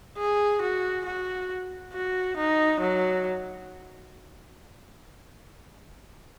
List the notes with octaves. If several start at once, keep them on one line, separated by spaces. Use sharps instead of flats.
G#4
F#4
F#4
F#4
D#4
F#3